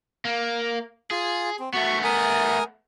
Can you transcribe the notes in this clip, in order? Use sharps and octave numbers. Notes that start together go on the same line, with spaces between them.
A#3
F4 G#4
C4
A3 B3 F#4 C#6
A#4 G#5 D#6